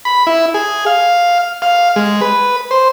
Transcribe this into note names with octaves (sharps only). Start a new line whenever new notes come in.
B5
E4
G#4
F5
F5
G#3
B4
C5